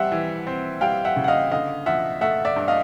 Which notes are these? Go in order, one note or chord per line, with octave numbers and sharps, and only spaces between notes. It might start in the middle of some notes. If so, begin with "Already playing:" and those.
Already playing: G3 C4 E5 F#5
E3
C4
G3 F5 G5
E5 F#5
C#3
F#5
D#5 F5
D3 D#5 F5
F3 E5 F#5
A3 E5 F#5
D5 E5
G2
D#5 F5